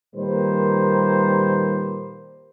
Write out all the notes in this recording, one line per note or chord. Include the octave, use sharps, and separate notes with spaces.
A#2 D#3 G3 A#3 B4 C5